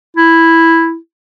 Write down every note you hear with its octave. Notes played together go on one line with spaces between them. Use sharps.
E4